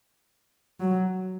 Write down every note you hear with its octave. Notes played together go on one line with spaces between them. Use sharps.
F#3